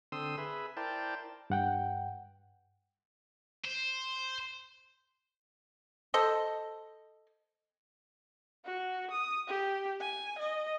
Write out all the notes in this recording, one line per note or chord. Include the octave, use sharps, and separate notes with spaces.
D3 C4 C6 D#6 E6
G#4 B4 E5
E4 A#4 C5 D5 G5 A5
G2 F#5 G5
C5
A4 C5 D#5
F#4
D#6
G4
G#5
D#5